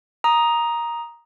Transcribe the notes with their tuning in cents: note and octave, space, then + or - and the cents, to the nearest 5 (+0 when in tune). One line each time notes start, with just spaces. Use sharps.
A#5 +10 D#6 +0